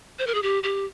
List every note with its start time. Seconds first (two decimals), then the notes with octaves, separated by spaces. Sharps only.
0.19 C5
0.27 A#4
0.34 G#4
0.42 G4
0.63 G4